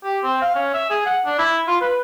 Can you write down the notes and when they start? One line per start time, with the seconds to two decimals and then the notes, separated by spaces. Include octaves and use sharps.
0.04 G4
0.23 C4
0.42 F5
0.55 C#4
0.74 E5
0.90 G#4
1.06 F#5
1.26 D4
1.39 E4
1.68 F4
1.81 B4